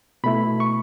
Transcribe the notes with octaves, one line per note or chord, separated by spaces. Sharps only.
B2 A3 E4 B5
C#6